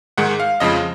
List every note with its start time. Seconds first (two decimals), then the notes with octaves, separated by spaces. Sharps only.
0.18 G#2 D#3 G#3 F#5
0.40 F5
0.60 F2 C#3 F3 G#3 D#5